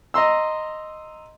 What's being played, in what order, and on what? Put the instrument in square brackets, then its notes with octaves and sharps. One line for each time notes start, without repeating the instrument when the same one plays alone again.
[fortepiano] D#5 A#5 C6 E6